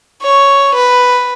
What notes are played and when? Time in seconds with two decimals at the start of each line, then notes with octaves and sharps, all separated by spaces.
0.22 C#5
0.75 B4